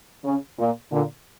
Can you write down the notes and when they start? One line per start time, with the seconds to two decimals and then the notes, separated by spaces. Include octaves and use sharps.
0.25 C#3
0.59 A#2
0.92 A#2 D3